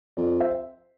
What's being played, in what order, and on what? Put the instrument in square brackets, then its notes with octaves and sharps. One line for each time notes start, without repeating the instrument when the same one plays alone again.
[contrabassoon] F2 [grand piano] D5
[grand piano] C5 E5